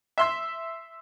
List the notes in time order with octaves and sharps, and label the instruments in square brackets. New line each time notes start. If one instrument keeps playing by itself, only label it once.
[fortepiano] E5 C6 E6